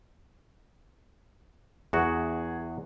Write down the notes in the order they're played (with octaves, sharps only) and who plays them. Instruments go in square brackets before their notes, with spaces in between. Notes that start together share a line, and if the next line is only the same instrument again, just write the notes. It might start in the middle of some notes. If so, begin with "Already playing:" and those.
[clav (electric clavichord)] E2 F#4 [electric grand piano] G#4